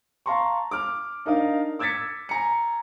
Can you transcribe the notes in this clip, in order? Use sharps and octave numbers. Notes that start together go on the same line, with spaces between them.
F5 A5 A#5 C6 C#6
D6 F6
D4 D#4 A#4 D#5 F5
D6 E6 G#6 A6 B6 C#7
G#5 A#5 C#7